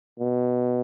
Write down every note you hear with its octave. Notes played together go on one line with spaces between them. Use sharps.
B2